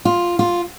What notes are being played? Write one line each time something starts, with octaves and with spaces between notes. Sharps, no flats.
F4
F4